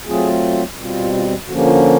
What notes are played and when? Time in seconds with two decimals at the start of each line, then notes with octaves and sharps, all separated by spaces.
0.07 F#3 A3 C4 F4 G#4
0.78 B2 G3 C4 F4
1.13 F4
1.48 D3 F3 A#3 C#4 F#4
1.57 G4
1.66 F4
1.75 F#4